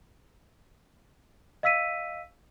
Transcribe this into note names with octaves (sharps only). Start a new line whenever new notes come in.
D#5 F5 E6 B6 D#7